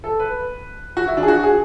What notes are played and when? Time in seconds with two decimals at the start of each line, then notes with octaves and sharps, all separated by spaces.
0.04 A4
0.19 B4
0.97 F#4
1.07 E4
1.17 D4
1.23 G#4
1.28 F#4
1.43 G#4